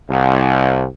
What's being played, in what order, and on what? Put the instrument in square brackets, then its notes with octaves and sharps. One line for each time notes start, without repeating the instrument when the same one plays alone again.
[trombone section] C2